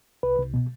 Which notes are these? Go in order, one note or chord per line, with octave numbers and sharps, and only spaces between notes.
C2 B4
C2
B2